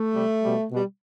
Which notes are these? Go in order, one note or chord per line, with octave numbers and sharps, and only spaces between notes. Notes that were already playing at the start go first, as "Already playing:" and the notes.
Already playing: A3
C3 G3
B2 G3
B2 G3